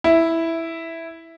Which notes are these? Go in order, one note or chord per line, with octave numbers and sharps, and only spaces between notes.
E4